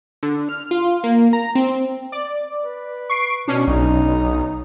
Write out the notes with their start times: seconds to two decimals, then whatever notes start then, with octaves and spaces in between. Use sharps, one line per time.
0.23 D3
0.49 F6
0.71 F4
1.04 A#3
1.33 A#5
1.55 C4
2.12 D5
2.64 B4
3.10 C#6 C7 D7
3.48 B2 C#4 D4
3.67 B1 D#4